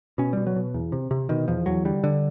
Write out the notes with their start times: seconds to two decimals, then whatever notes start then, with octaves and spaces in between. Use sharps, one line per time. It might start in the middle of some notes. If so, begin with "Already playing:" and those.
0.18 B2 C#4
0.33 B2 G3
0.47 F#3
0.56 B2
0.74 E2
0.92 C3
1.11 C3
1.29 B2 D#3
1.48 E2 F3
1.66 E2 F#3
1.85 D3 G3
2.04 D3